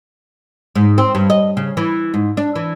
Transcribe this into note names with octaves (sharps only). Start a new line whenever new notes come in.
G#2
C4
G2
D#5
C#3
E3
G#2
D4
E3